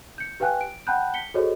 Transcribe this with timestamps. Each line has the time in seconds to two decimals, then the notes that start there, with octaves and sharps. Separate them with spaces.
0.18 G6 C#7
0.40 G4 B4 F5 G5 G#5 F#6
0.61 D7
0.87 F#5 G5 A5 B5 F#6 G6
1.14 B6 C#7 G7
1.34 F#4 G#4 A4 C5 C#5 D#5